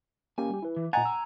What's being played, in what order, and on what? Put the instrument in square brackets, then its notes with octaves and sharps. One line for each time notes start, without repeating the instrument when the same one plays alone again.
[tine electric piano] A#3 C#4 G4 [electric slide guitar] G#5
[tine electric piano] G3 G4
E4 B4
[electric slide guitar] E3
[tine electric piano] A#2 D#5 A6 [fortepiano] F#5 G#5 [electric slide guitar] A#5
[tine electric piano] E6